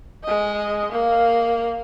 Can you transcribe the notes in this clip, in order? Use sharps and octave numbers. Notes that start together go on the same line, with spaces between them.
G#3 D#5
A#3 F5